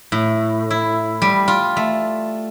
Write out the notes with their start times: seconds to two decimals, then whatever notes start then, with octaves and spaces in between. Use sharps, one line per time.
0.12 A2
0.70 E4
1.22 G3
1.48 F4
1.77 A3